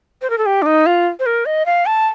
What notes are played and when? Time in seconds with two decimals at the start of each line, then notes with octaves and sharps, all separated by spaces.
0.22 C5
0.30 A#4
0.38 A4
0.46 G4
0.62 D4
0.66 D#4
0.86 F4
1.20 C5
1.26 A#4
1.46 D#5
1.66 F5
1.86 A5